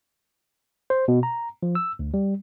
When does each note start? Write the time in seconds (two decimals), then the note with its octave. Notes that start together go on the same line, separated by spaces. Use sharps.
0.90 C5
1.08 B2
1.23 A#5
1.63 F3
1.75 E6
1.99 D2
2.14 G3